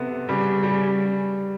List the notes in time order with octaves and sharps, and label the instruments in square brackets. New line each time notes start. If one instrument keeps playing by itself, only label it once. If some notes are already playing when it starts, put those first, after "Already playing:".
Already playing: [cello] C3 [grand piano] B3 A4
[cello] C#3 [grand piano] G3
[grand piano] G3